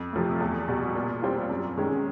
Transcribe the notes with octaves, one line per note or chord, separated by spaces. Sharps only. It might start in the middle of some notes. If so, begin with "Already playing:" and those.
Already playing: F2
C3 F3 A3
E2
B2 G3
A#2
G3 C4 F4
F#2
D#3 G#3 C#4